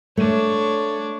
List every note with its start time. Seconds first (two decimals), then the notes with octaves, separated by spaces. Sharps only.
0.17 A3 D4 C#5